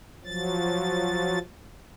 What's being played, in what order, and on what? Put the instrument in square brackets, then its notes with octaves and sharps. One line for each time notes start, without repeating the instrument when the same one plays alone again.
[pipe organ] F3 F#3 A6